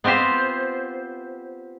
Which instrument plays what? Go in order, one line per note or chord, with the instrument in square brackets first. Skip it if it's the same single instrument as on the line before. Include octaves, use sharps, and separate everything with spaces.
[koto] B3 C4 F4 G4 C5